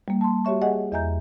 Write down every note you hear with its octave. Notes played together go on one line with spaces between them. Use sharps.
G3 A#3
A5 C6
F#4 G4 C#5 E5 C#6
G4 G#4 D#5 F#5 G#5
E2 D#5 E5 G#5 A#5 G6